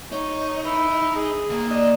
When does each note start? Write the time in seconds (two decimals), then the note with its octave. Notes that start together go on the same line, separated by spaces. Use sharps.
0.12 D#4 C#5
0.65 E4 B4
1.16 G#4
1.50 D#2 A#3
1.71 D4 D#5